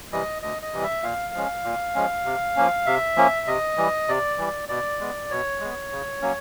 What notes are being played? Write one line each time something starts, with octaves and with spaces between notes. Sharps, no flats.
C3 E3 G3 D#5
D2 D#5
D#5
C3 E3 G3
E5
A#2 F5
F3 G#3 C#4
A#2
F3 G#3 C#4
C3
F3 A#3 C#4
C3 E5
F3 A#3 C#4
C3 D#5
E3 G3
C3 D5
E3 G3
B2 D5
G#3 B3
B2 C#5
G#3 B3
C#3
F#3 A#3 C#4